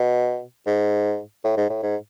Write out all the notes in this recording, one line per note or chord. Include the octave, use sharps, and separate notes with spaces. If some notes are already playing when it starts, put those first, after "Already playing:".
Already playing: B2
G#2
A2
G#2
A2
G#2